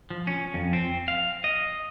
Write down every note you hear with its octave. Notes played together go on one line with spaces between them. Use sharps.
F3
C#4
F2
C4
F5
D#5